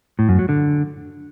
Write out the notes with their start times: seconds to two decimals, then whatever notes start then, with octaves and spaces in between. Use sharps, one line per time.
0.19 A2
0.29 F#2
0.39 F#3
0.49 D3